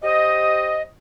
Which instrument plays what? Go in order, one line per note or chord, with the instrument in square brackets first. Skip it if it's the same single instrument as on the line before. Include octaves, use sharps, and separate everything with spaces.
[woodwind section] G4 C5 D#5